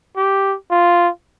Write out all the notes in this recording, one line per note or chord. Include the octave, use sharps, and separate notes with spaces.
G4
F4